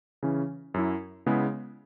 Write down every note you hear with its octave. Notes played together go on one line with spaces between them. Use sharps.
C#3 E3 C#4
F#2 F#3 E4
C#3 G#3 B3 E4